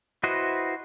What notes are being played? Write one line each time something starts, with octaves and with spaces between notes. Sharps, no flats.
E4 F#4 B4 C5 D#5